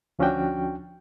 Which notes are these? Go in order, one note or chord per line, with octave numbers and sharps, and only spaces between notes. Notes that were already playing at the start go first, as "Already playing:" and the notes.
D2 F3 C#4 D4 F#4 G5